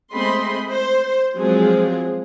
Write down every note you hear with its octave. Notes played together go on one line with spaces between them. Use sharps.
G#3 A3 C4 D#5 B5 C6
C5
F3 F#3 G#3 C4 G#4